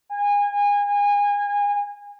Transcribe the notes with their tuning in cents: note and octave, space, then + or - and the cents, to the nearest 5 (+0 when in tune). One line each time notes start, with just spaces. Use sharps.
G#5 -30